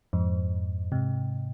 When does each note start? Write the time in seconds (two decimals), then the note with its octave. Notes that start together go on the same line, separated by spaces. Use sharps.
0.13 F2 G#2
0.92 G#2 C3